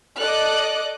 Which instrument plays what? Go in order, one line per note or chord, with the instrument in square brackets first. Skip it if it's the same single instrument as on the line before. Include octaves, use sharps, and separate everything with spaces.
[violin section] A4 D5 D#5 D6 F#6